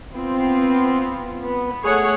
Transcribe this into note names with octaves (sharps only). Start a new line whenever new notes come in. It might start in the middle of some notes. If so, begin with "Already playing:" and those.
B3 C4 F4
B3
A3 G#4 C#5 F#5